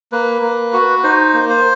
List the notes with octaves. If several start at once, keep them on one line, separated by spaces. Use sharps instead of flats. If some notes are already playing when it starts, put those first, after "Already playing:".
A#3 B4
A#3
F#4
D#4 C5
A#3
C5